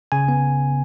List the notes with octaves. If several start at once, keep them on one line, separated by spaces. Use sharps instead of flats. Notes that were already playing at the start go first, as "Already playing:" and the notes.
C#3 G#5
B3